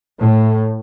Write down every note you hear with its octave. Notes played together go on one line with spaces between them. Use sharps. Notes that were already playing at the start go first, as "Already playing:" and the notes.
A2